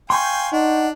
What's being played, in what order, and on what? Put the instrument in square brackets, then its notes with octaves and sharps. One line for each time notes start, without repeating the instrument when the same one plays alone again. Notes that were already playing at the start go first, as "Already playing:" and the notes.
[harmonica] F5 G5 G#5 [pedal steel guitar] C6 C#6 G6
[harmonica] D4 [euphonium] D#4 [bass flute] F#5